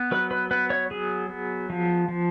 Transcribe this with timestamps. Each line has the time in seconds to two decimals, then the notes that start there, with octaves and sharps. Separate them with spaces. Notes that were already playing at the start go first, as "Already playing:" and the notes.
Already playing: B3
0.11 F#3 B4
0.31 B4
0.51 B3 B4
0.70 C#5
0.91 F#3 G#4
1.29 B3
1.70 F3
2.08 F3